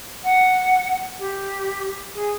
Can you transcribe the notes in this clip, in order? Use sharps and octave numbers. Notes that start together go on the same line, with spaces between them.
F#5
G4
G#4